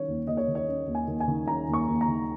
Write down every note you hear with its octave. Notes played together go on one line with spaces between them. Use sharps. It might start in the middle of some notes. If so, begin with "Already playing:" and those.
Already playing: D#3 C#4 C#5
D#2
D#2 D#5
C#5
D#3
C#5
C#4
D#2
G#5
D#2
G#5
D#3
C#4 A#5
D#2
C#6
D#2
A#5
D#3